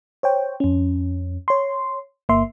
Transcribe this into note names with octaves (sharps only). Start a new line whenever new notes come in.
C5 C#5 G5
F2 C#4
C#5 C6
G1 A#3 E5 C6